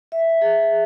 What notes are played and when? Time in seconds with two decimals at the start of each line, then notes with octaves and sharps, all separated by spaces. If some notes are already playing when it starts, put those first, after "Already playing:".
0.12 E5
0.41 G#4